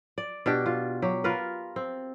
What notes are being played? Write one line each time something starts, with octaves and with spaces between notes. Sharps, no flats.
D5
B2 D4 G4
F4
F#3 G4
F4 A#4 B4
C4